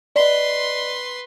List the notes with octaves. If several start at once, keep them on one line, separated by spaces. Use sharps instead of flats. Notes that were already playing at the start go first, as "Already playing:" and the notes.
B4 D5 D#5 C6